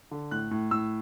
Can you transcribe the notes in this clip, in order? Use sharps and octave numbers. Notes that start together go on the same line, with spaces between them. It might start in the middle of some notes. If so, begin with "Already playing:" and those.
D3
A2 F#6
A2
A2 E6